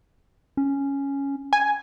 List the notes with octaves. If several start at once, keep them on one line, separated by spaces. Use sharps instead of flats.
C#4
G#5